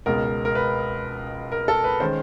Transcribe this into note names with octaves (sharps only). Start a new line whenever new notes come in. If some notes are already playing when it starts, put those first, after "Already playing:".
C#2 B2 G#3 A#4
A#4
B4
A#4
A4
B4
D#3 G#3 C#4 C5